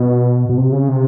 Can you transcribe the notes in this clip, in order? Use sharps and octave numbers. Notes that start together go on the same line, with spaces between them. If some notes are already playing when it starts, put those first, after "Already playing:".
Already playing: B2
B2
C3
C#3
C3